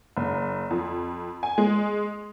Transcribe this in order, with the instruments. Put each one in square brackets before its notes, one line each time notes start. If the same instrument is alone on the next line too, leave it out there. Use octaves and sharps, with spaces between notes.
[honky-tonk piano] F#1
F2
G#5
G#3